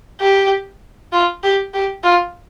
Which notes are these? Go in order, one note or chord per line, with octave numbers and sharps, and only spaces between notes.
G4
F4
G4
G4
F4